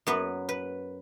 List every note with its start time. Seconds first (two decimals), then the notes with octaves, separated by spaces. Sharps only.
0.07 F#2 F#3 B3 B4
0.49 B4